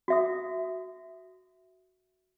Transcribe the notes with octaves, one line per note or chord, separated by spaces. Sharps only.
F#4 E5 D#6